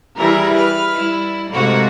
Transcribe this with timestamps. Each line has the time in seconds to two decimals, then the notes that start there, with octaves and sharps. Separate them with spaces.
0.18 E3 G3 E4 G#4 A#4
0.55 B4 F6
0.97 G3 E4
1.52 G#2 C3 A3 A#3 F#4